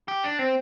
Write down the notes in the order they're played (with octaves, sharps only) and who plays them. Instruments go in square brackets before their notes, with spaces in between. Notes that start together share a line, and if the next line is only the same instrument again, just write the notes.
[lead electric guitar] G4
D4
C4